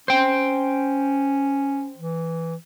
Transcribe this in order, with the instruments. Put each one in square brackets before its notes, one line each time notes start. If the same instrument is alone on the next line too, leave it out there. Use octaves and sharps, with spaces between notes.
[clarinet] C#4 [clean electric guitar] C5 G5
[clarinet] E3